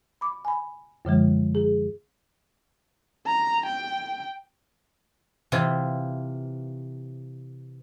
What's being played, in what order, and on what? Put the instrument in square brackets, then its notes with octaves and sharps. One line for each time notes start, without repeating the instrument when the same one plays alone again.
[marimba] B5 D6
G#5 B5
F#2 D3 F3 G#3
G#4
[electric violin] A#5
G5
[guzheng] C3 E3 F4